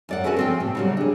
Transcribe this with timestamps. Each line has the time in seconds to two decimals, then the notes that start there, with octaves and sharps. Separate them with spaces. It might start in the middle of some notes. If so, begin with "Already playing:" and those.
0.09 F#2 D5 F#5
0.24 C#4 D#4 F#4 G#4 A4 B4
0.37 F3 C4 G5
0.60 A2 C3
0.75 C#3 F#3 G3
0.97 D4 G#4